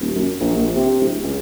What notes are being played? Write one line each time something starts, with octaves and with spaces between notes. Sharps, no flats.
D#1
F#2
A#1
A#1
C3
D1
C#2